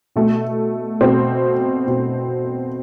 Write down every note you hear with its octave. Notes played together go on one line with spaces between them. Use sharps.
B2 A3
B2 C4
B2